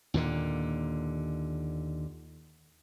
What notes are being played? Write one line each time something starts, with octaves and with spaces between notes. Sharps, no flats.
D#2 A#2 D3